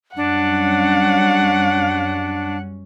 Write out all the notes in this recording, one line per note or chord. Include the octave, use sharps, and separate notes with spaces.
F#2 G3 C#4 D4 F#5